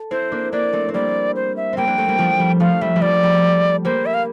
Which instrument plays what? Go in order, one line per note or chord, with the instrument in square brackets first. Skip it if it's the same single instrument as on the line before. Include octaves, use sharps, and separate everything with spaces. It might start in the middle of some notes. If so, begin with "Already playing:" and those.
Already playing: [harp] A4
[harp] C4 E4 [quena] C5
[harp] A#3 D4
[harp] A#3 D4 [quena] D5
[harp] A3 C4
C4
[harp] G3 A#3 [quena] D5
[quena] C5
E5
[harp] G3 A#3 C4 [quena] G5
[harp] A#3 D4
A3 C4
G3 A#3
F3 A3
G3
[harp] F3 A3 [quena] F5
[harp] G3 [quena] E5
[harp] G3
[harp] F3 [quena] D5
[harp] G3
[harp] G3 A#3 [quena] C5
[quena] E5
F5